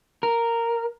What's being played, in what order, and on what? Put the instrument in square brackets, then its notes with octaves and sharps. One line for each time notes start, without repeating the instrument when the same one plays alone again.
[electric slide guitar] A#4